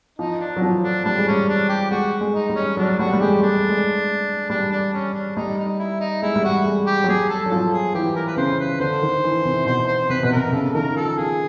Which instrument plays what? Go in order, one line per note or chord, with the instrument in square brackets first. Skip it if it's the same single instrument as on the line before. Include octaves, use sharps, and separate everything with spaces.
[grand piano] F3 [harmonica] D#4
[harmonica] D4
[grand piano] F#3
F3
[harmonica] D4
[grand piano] G3 [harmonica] D4
[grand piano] G#3
[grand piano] G3 [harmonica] C#4
[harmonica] D4
G4
[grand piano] G#3 [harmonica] F#4
[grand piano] G#3
[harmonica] D#4
[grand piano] G3
[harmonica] C#4
[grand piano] F#3 [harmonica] D4
[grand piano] G3 [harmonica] F#4
[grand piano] G3
[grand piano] G#3 [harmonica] G4
[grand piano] G#3 [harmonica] D4
[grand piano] A3
G#3
[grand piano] G3 [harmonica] D4
[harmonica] D4
C#4
D4
[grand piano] G3 [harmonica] D#4
[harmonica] D#4
E4
D#4
[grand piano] G#3 [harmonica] E4
[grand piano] G3
[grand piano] G#3 [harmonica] F#4
[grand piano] G#3
[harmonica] G4
[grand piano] F#3
[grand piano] G3 [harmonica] G#4
[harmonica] A4
[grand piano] F#3
[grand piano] F3 [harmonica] A4
[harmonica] G#4
[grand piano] E3 [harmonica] G4
[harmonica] A#4
B4
[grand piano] C#3 [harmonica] C5
[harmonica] B4
[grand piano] D3 [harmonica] C5
[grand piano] D#3
E3
C3
[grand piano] B2 [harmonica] C5
[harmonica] C5
[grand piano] C3 [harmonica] B4
[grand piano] B2 [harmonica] B4
[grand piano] C3 [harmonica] A#4
[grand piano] C3
[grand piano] C#3 [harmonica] A4
[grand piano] D#3 [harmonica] A#4
[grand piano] F3 [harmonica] A4
[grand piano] F3 [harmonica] G#4